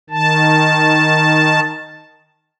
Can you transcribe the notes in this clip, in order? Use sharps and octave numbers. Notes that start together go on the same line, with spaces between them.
D#3 A5